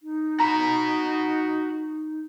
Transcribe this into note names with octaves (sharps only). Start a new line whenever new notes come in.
D#4
F#4 A#5 B5